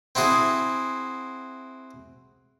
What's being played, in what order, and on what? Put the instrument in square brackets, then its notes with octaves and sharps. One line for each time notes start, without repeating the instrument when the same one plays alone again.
[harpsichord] C4 E4 F#4 G#4